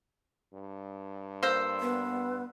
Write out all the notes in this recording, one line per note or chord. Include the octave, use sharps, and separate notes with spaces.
G2
A#3 C5 C6 E6
B3